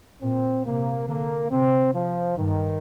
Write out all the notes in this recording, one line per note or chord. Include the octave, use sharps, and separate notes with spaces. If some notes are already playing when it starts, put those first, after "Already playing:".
A#2 C4
C3 A#3
D3 A#3
C3 C4
F3
G2 D#3